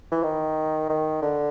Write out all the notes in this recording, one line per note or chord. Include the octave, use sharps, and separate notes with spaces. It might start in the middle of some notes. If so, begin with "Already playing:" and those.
E3
D#3
D#3
D3